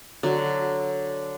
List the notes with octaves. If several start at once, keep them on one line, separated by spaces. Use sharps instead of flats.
D3 F#3